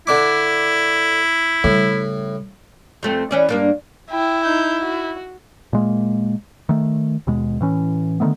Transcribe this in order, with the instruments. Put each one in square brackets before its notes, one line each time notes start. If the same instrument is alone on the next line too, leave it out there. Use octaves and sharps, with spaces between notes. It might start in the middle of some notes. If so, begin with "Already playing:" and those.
[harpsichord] D3 D4 D6 [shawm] E4
[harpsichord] A2 [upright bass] C#3 G3
[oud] F2 A3 C4
E3 C#4 D5
G2 A#3 D4
[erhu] E4 [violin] G5
[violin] D#4 G6
F#4
[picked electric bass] A#2 G#3 A#3
D#3 A3
D#2 B2 G#3
A2 E3 C#4
D3 D#3 A3 B3